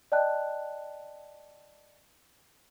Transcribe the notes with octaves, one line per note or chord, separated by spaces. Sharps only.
D5 D#5 G5 A5 F#6